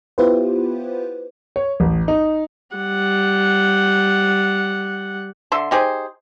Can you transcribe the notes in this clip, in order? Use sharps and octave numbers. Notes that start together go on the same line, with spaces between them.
B3 E4 F4 G4 B4 C5
C#5
A1
D#4
G3 F#5
D3 E5 C6
D#4 G4 G#4 C5